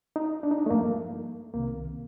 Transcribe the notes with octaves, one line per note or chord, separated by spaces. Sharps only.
D#4
D4
D#4
D4
A3
G2 F3 A#3
C2 C3 D#3 A#3